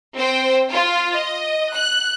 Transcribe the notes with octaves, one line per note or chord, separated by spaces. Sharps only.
C4 C5 G5
F4
D#5
F#6